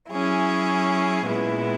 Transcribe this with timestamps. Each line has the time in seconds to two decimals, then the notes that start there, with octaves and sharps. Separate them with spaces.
0.11 F#3 C#4 E4 G#4
1.27 A#2 G#3 B3 E4